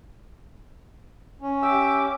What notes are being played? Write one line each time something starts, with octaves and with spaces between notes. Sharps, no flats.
C#4
G4 E5 D6 E6